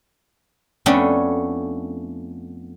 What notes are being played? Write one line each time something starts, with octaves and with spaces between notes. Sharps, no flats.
F2 A3 B3 C#4 D4 C#5